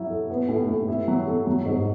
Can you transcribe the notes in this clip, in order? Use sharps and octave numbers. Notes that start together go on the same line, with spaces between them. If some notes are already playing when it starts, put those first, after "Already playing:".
Already playing: F#3 E4
A4
B3
A2
A2
E4
F#3
A4
F#3
G#2